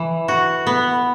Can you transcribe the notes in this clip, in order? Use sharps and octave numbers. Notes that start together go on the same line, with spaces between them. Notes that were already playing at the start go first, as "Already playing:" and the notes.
Already playing: E3
F#4
B3